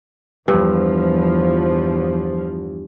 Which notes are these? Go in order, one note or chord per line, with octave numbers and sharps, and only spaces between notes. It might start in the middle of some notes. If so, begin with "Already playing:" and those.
E2 G2 F3